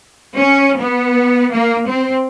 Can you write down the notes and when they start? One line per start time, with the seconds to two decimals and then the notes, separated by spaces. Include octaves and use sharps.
0.37 C#4
0.79 B3
1.52 A#3
1.89 C4